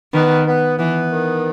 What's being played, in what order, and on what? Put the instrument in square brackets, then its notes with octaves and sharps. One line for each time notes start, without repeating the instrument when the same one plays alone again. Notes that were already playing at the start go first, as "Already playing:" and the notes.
[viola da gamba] D#3 [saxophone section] B3
[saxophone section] B3
[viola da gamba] E3 [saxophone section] B3
[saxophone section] D#3